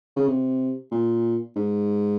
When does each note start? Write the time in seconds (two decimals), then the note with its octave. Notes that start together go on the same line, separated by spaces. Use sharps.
0.16 C#3
0.28 C3
0.91 A#2
1.56 G#2